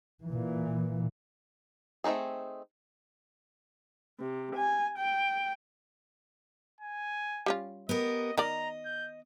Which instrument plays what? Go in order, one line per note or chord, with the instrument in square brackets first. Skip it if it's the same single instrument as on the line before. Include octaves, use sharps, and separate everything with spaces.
[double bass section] A#2 E3
[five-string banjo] A3 C4 D4 D#4 G#4
[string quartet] C3
G#5
G5
[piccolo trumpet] G#5
[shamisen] G3 C#4 F4
[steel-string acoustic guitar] B3 G4 A#4 [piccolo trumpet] D#5
[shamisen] D#3 A#4 D5 [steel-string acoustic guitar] D#5 [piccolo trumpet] A#5
[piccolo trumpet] G6